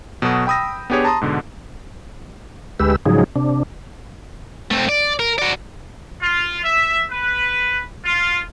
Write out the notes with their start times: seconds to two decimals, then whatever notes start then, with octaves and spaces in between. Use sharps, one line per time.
0.22 B2 F#3 F#4 A4 D#6
0.47 G5 B5 D#6 E6 A#6
0.90 B3 D4 G4 G#4 C#5
1.05 A5 A#5 C6 D#6
1.21 G#2 B2 D3
2.80 D2 G#3 G4 B4 E6
3.06 G#2 C#3 F3 F#3 D#4 G#4
3.36 C3 D4
4.71 A3 C4
4.89 D5
5.19 A#4
5.38 F#4 D5
6.21 F4
6.63 E5
7.10 B4
8.04 F4